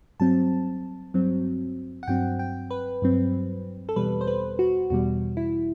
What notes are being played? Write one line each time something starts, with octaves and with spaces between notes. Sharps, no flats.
G2 F#3 C4 A5
G2 F#3 C4
F#5
G2 F#3 C4 G5
G5
B4
G2 F#3 C4
A4
E2 B2 G3 B4
C5
B4
F#4
E2 B2 G3 F#4
E4